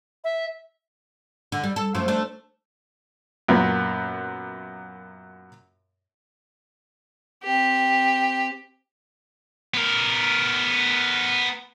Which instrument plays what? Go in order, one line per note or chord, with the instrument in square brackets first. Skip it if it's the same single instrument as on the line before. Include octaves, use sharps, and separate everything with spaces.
[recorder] E5
[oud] D3
G3
A4
F#2 F3 A3
A3 D4
[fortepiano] F#2 A#2 B3
[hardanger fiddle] C4 G4
[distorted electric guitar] B3 A#4